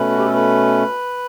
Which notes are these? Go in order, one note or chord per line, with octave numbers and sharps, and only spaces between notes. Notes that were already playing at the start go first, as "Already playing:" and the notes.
Already playing: B2 A3 C#4 B4
F#4
G4
A4
B4